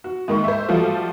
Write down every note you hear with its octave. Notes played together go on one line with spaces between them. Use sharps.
F#4
G#2 D#3 A#3 C#6
C5 E5
F3 G3 A3 F4 F#4